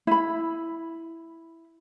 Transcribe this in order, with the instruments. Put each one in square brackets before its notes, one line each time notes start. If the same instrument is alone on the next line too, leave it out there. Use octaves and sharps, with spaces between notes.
[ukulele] E4 B5